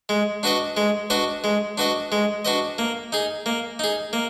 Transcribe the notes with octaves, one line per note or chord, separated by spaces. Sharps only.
G#3
D4 F#4 B4 D#5
G#3
D4 F#4 B4 D#5
G#3
D4 F#4 B4 D#5
G#3
D4 F#4 B4 D#5
A#3
D#4 G#4
A#3
D#4 G#4
A#3